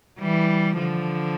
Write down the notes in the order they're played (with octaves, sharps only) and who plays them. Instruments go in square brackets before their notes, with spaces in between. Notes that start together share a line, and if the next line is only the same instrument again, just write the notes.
[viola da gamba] E3 G3
D3 F3